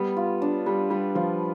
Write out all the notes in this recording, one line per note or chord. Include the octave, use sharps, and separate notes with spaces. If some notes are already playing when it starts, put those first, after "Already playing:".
Already playing: G3 B3
F4
D4
G3 B4
G3 B3
F3 F4